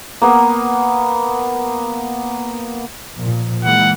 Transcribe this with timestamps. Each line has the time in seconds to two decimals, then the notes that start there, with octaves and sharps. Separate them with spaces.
0.22 A#3 B3
3.17 A#2 F3
3.65 E3 G#3 A#3 F#5